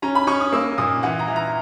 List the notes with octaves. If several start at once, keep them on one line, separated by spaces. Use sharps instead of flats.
C#4 A#5
B5
C#4 C#6
D#6
A#3 E6
A#2 D#6
E3 F#5
A#5
E3
A#5